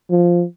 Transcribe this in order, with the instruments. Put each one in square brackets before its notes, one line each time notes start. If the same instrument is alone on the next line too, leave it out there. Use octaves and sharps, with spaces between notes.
[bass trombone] F3